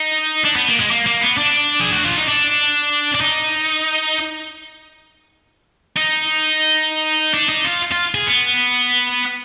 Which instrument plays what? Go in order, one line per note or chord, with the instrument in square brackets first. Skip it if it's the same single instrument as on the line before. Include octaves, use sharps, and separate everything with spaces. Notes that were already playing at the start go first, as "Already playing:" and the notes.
Already playing: [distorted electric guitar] D#4
D4
B3
A#3
G#3
A#3
A#3
B3
D4
G#4
F#4
F4
D#4
D4
D4
D#4
D#4
D4
D#4
F4
F4
G#4
B3